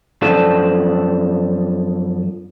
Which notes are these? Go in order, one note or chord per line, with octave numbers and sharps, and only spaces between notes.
F#2 F3 D4 A4